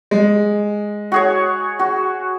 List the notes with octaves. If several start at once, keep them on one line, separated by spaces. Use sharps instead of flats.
G#3
F#4 G#4 C#5
F#4